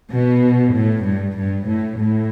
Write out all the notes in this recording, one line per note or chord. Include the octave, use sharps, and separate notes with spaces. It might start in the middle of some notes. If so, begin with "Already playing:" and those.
B2
A2
G2
G2
A2
A2